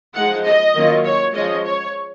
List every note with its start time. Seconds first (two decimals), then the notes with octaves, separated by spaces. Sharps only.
0.14 F3 G#3 D#4 F#5
0.44 D#5
0.74 D#3 F#3 A#3 C#4 F4
1.04 C#5
1.34 F3 G#3 C#4 F4 D#5
1.64 C#5